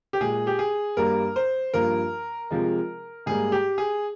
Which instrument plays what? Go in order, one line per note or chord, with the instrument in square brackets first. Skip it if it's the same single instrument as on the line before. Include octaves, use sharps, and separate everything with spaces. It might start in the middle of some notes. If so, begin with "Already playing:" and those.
[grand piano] G4
A#2 G#3 G#4
G4
G#4
G2 G3 A#3 A#4
C5
G2 F3 A#3 A#4
C3 F3 G#3
G#2 G3 A#3 G#4
G4
G#4